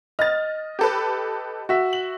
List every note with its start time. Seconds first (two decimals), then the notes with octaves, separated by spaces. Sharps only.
0.19 D#5 F6 A6
0.79 G4 A4 B4
1.69 F#4 E5
1.93 F#7